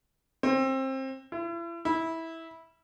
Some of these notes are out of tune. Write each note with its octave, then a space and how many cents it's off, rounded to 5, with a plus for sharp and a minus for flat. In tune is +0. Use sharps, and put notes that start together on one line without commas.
C4 +25
E4 +40
E4 -15